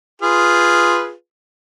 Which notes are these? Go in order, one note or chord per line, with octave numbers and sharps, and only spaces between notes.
F4 G#4 B4